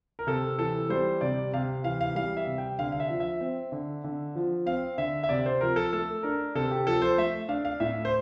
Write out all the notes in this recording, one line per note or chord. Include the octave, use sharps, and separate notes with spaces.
A#4
C3 A4
E3 A4
G3 C5
C3 D5
C3 F5
E3 F5
F5
G3 F5
E5
C3
G5
D3 F5
F5
E5
F3
E5
C4
D3
D3
F3
C4 F5
D3 E5
E5
C3 D5
C5
F3 A#4
A4
A3 A4
D4 A#4
C3 A4
G4
F3 A4
C5
A3 E5
D4 F5
F5
A2 E5
C5